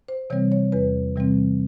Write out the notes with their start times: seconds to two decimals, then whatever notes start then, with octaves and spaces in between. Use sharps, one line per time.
0.08 C5
0.30 C3 E3 G3 C4 C#5
0.52 C#5
0.72 E2 B4
1.16 C3 E3 G3 C4